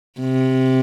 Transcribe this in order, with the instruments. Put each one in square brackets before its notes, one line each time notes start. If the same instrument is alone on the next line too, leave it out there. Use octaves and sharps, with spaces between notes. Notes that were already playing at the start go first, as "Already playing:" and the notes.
[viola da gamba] C3